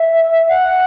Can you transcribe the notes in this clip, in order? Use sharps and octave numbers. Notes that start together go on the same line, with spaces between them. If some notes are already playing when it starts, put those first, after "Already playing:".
Already playing: E5
F#5